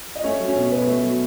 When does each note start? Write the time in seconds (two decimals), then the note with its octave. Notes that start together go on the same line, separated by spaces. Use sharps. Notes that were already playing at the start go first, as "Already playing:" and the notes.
0.16 D#5
0.24 A3 C#4 C#5
0.40 F#3
0.48 C#4 C#5
0.56 B2
0.72 B2 B3 B4
0.87 A3
1.03 F#3